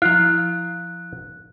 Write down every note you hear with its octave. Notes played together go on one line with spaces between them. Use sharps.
F3 E4 F5 F#6